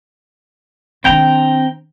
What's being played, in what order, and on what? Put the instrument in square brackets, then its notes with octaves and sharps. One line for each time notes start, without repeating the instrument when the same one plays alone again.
[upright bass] D#3 D4 [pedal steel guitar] C4 G5 A#5